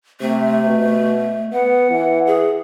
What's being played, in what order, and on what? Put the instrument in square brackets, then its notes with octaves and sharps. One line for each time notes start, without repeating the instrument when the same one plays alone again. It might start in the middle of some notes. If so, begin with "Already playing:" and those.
[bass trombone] C3 [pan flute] A3
[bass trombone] B2
[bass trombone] B3 [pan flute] F#5
[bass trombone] E3
[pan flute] G#4